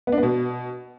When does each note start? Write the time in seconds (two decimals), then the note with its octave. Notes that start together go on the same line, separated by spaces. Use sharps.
0.07 B3
0.12 D4
0.18 B3
0.23 B2